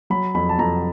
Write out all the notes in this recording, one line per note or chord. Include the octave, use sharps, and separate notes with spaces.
F#3 B5
F2 B5
A5
F2 A#5